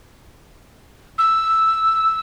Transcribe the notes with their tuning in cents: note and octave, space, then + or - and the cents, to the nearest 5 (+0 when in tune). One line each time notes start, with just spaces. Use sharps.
E6 +0